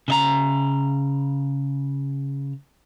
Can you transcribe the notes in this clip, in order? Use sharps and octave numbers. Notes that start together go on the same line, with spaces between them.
C#3 D#5 A#5